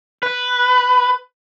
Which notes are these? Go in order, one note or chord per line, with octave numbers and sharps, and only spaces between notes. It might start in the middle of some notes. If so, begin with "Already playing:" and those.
B4